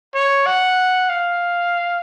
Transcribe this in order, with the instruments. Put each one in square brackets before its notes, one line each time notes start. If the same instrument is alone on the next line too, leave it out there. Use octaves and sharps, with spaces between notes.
[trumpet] C#5
F#5
F5